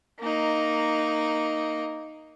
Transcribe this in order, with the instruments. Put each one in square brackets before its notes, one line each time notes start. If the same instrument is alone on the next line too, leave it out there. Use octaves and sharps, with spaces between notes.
[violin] A#3 D#4